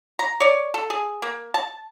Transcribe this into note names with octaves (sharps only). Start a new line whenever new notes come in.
A#5
C#5 D5
A4
G#4
A#3
A5